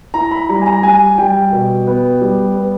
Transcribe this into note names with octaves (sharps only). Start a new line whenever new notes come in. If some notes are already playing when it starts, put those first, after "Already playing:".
E4 A#5
B5
G3 A#5
G#5
A#5
G3 G#5
G3 G5
B2
B3
G3
B3